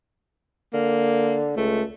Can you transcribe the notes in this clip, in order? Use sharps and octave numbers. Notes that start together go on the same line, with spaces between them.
D3 A#3
C#2 A3